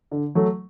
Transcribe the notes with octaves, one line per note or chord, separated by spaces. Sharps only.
D3
F#3 A3